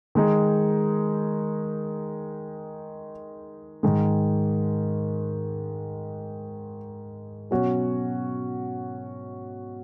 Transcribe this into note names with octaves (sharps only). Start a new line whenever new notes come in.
D#3 G#3 D#4 G#4
G#2 D#3 G#3
B2 F#3 C#4 F#4